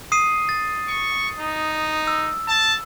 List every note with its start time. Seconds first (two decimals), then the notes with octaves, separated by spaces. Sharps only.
0.12 D#6 C7 D#7
0.49 A6
0.88 C#6
1.38 D#4
2.07 E6
2.48 A5